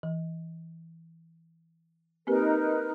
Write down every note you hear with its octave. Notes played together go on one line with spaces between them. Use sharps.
E3
A#3 C4 D#4 G4 A#4 B4